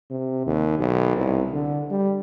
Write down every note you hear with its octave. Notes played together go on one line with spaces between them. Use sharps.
C3
D#2
B1
C2
D3
G3